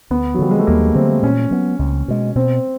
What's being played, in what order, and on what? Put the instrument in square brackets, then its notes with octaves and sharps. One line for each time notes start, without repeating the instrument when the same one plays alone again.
[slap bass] D2 [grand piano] B3
[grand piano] F#3
[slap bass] D3 F3 [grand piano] G3
[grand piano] G#3
A3
[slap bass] D#2 [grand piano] A#3
[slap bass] D3 F#3 A3 [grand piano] C4
[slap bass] A#2 [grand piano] C#4
[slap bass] F#3 B3
C#2
B2 G#3
[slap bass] B2 [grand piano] C4